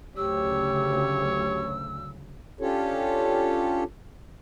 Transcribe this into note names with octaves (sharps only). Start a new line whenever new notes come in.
D2 C#3 F#3 G4 C#5 E6
C#4 D4 F4 G4 A4 C#5